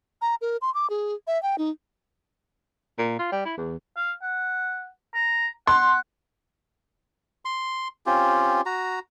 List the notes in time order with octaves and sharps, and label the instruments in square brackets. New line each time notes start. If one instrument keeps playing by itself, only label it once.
[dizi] A#5
A#4
C6
D6
G#4
E5
G5
D#4
[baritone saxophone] A#2
F4
G3
E4
E2
[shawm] F5
F#5
A#5
[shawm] F#5 [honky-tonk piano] C6
[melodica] C6
C4 C#4 F4 G4
F#4 A#5